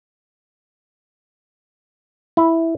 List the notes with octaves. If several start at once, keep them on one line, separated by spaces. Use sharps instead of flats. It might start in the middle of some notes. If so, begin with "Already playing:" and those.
E4